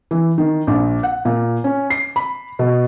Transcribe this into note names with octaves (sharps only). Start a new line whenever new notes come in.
E3
D#3
A#1
F#5
A#2
C#4
C7
B5
B2